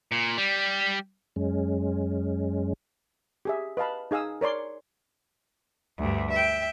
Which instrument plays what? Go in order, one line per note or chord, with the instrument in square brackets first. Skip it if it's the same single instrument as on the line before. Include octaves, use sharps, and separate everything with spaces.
[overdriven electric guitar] A#2
G3
[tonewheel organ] F#2 G#3 C#4
[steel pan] G4 G#4 E5
B4 D#5 F5 A5 B5
D#4 G#4 F5 D#6 E6
A#4 C#5 D5 C6 D6
[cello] D2 G2
E5 G5